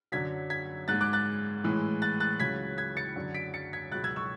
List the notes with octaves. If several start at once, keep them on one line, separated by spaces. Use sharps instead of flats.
F#2 D3 F#3 G#6 B6
G#6 B6
G#2 G#3 F#6 A6
D6 F#6
F#6 A6
A2 E3 G#3
F#6 A6
F#6 A6
C#2 C#3 F#3 G#6 B6
G#6 B6
A6 C#7
F#2 D3 F#3
B6 D7
A6 C#7
G#6 B6
C#2 B2 F#3 F#6 A6
E6 G#6
C#6 E6